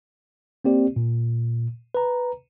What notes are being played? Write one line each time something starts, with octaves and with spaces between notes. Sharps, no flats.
A#3 C4 G4 D5
A#2
B4 A#5